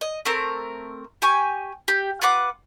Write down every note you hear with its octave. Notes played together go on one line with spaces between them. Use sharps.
D#5
A3 C4 A#4
G4 G#5 C#6
G4
F4 B4 F#5 D6